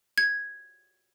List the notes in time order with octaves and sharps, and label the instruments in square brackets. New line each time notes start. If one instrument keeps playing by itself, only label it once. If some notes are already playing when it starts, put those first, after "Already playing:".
[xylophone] G#6